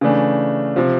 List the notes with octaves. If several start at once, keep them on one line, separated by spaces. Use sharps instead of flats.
C#3 E3 A3 D4
C3 F3